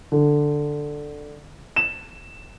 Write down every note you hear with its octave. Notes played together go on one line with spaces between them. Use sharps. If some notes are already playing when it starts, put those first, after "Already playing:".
D3
E7